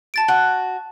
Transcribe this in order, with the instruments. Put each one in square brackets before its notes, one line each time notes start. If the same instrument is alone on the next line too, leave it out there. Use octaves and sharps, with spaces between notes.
[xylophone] A5 A6 D7
[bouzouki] F#4